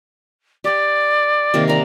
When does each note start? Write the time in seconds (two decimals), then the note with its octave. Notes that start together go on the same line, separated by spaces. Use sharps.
0.64 G4 D5 G5
1.54 C3 D#3 A#3
1.68 A#4 D5 D#5 A#5